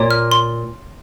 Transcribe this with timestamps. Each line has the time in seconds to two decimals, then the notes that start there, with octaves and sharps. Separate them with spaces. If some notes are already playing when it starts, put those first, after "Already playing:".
Already playing: A#2 C#5
0.11 F6
0.31 C6